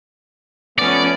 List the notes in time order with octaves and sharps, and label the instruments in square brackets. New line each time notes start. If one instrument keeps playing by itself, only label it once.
[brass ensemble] F3 A3 B3 [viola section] C#4 [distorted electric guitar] D5